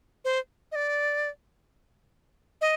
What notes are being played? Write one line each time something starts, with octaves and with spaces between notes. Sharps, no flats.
C5
D#5
D5
D#5